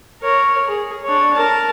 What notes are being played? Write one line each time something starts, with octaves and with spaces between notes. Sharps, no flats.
A#4 C#5
G#4
D4 C#5
A#4 A5